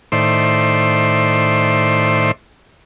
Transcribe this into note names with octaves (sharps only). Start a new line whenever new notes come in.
A2 D#3 C5 D5 E5 C6